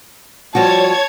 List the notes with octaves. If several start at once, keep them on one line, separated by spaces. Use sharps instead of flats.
F3 G3 F#4 C#5 A5 G#6